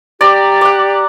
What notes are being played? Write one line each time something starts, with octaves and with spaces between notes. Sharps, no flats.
G4 D5 A#5
D5 F#5